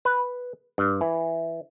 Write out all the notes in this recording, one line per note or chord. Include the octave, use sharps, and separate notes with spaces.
B4
G2
E3